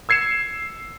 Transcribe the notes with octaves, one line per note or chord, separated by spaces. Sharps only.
E6 G#6 C7 C#7 E7